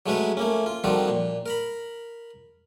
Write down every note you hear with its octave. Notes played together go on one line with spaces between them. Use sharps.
F#3 G#3 A3 C#4 B4 C#5
A3 A#3 C#4
F4
D#3 F3 G3 C4 F#4 A4
A#2
A#4 A#5 B5